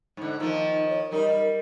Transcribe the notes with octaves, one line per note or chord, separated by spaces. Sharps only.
G#2 D3
D#3 F3 A#3 D#4
C#5
F#2 G3 D#4 A#4
G3